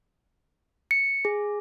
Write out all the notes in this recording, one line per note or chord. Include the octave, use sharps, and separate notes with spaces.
C#7
G#4